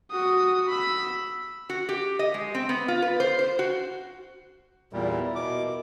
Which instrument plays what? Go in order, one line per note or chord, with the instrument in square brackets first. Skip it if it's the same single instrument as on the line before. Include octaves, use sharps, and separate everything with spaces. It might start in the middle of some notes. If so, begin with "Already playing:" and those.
[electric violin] F#4 D#6
B5 E6
[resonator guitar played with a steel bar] F#4
G4
D#5
G#3
C4
B3
F4
B4
C5
C5
F#4
[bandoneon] E2 A#2 G3 [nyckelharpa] E4 A#4
[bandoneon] B2 D6